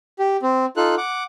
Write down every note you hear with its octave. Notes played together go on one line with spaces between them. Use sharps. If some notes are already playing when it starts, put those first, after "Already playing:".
G4
C4
D#4 F4 A4 F#6
F#5 D6